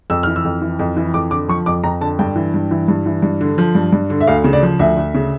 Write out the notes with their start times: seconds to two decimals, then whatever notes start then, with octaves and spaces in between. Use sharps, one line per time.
0.10 F2 E6
0.23 E3 F6
0.36 E6
0.44 F2
0.62 E3
0.79 F2
0.97 E3
1.14 F2 D6
1.31 D3 D6
1.49 F3 C#6
1.66 F2 D6
1.84 F2 A#5
2.01 D3 A5
2.19 G2 G5
2.36 E3
2.54 G2
2.71 E3
2.88 G2
3.06 E3
3.22 G2
3.41 D3
3.58 F3
3.75 G2
3.92 G2
4.10 D3
4.21 E5
4.27 D2 F5
4.44 C#3
4.53 D5
4.63 F3
4.79 D2 E5
4.97 D2
5.14 C#3